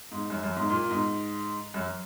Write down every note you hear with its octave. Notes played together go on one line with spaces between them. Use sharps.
G#2
F#2
F#2
G#2
A#2
G#2
F#2